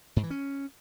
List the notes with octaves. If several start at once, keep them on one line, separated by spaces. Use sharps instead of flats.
G#2
E3
C#4